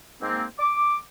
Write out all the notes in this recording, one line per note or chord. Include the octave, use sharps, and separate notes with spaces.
G#2 A#3 C4
D6